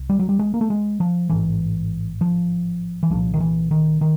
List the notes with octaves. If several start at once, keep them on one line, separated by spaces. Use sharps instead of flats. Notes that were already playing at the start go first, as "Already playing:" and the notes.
Already playing: C2
G3
F#3
G3
G#3
A#3
A3
G#3
F3
A1 G#2 E3
F3
E3
C2 A#2 F3
D#3
E3
D#3
D#3